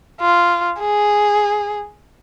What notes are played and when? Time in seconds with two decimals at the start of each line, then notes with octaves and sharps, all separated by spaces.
0.21 F4
0.80 G#4